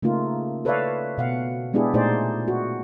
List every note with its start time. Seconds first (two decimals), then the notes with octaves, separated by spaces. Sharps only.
0.03 C#3 A3 A#3 D#4 F4
0.65 A4 B4 C#5 D5 E5 F5
1.18 B2 F5 F#5
1.73 G#3 B3 D4 E4 G4 G#4
1.94 A#2 A3 D#4 G#4 C5 D5
2.48 F#4